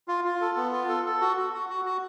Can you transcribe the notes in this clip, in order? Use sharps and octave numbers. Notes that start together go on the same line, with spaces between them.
F4
F4
A4
B3
F4
A4
A4
F#4
F#4
F#4
F#4
F#4